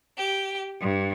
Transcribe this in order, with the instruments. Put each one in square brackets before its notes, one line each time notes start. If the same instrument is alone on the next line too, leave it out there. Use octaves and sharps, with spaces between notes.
[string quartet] G4
G2